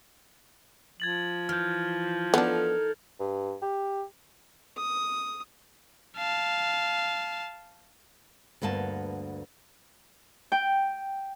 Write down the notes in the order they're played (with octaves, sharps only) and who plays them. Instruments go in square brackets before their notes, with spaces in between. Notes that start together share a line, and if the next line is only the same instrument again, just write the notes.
[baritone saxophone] F3 [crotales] G#6 A6 F#7
[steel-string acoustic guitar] E3 [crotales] F6 G6
[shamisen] B3 D4 [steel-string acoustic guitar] D#4 A4 A#4
[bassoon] G2
G4
[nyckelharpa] D#6
[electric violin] F5 A5
[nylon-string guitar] D2 G2 A#3 B3 A5
[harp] G5